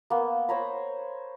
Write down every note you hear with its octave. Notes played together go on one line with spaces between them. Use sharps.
A#3 B3
C5 C#5 A#5 B5